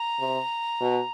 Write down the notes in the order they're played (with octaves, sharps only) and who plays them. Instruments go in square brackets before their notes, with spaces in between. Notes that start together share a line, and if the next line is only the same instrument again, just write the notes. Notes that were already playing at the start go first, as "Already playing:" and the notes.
Already playing: [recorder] A#5
[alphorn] C3
B2